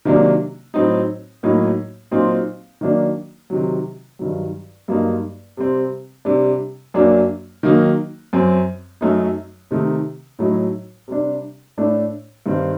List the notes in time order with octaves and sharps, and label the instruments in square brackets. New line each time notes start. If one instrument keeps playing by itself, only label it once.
[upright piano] C3 D#3 F#3 A#3 D4
A2 F#3 C4 D#4
A2 F#3 A#3 D#4
A#2 F#3 C4 D#4
D#3 F#3 A#3 D4
C3 D#3 F#3
G2 D#3 F#3
G2 F#3 A#3 D#4
C3 G3 C4
C3 G3 D4
F#2 F#3 A#3 D4
D#3 F#3 A#3 D#4
F#2 F#3 C4
F#2 F#3 A3 D#4
C3 D#3 A3 D#4
A2 F#3 A3 D#4
C3 G3 D4
A2 A3 D4
G2 D#3 G3 C4